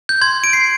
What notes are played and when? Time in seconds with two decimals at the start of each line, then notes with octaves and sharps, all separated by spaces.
0.09 G6
0.21 C6 G#6
0.44 D7
0.53 C7